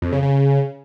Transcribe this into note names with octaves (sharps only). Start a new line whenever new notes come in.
F2
C#3
C#3